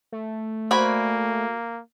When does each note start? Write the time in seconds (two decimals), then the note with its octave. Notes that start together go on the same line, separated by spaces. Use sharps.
0.12 A3
0.71 A#3 F#4 C5 D5 G#5 B5